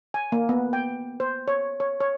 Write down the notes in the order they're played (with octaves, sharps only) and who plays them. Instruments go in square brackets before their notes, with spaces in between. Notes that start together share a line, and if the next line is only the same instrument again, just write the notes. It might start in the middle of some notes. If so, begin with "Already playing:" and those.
[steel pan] G#5
A#3
B3
G5
C5
C#5
C#5
C#5